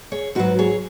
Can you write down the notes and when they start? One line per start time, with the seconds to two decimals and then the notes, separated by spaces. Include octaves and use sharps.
0.12 G#4 C#5
0.35 G#2 F#3 F#4 B4
0.59 G#4 C#5